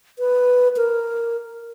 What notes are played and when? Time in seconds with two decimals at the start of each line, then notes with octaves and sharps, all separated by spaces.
0.19 B4
0.77 A#4